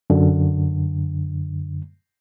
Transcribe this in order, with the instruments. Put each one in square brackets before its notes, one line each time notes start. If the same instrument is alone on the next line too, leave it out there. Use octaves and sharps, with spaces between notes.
[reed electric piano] F#2 D3